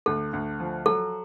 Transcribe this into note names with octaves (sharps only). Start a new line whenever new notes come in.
D2 A4
D2
F3
F#3 A4